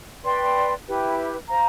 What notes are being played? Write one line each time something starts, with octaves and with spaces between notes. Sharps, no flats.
B4 D5 G5 C6
E4 G4 B4
C5 F5 A#5